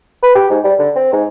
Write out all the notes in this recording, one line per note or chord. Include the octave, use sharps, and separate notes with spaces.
B4
G4
G#2
G3
D3
C4
G#2